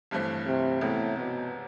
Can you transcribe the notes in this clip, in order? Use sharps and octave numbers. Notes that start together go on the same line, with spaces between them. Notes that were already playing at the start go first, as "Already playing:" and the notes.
G1 G2 E3 A3 C4
C3
E1 E2 A2 C3
B2